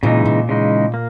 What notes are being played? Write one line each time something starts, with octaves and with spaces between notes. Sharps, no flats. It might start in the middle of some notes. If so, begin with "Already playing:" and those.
A#2 C#3 E3 G#3 D#4
A#2
C#3 E3 G#3 D#4
A#3